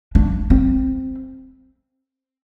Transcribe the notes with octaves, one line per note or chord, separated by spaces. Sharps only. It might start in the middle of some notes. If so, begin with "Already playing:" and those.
D4
C4